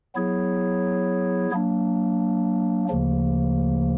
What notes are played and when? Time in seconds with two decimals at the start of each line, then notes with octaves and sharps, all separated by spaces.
0.15 F#3 B3 E4 G#4 C#5
1.51 F#3 A#3 D4
2.88 D2 C#3 F3 A#3